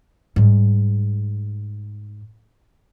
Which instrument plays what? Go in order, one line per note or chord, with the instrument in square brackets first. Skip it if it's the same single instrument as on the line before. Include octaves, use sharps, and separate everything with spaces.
[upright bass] G#2 G3